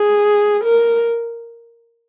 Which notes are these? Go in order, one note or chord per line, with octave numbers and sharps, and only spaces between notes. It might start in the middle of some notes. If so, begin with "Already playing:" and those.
Already playing: G#4
A#4